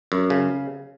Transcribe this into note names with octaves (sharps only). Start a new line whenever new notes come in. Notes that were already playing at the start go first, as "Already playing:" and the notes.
F#2
C#3